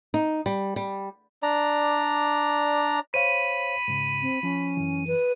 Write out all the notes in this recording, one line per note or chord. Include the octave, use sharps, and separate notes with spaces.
D#4
G3
G3
D4 D5 A#5
C5 C#5 F5 B5 D#7
G#2 C#3
C4
F3 C#4
F#2 E3
B4